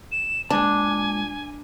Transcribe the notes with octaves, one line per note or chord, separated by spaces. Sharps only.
E7
A#2 G#3 D4 G#5 A5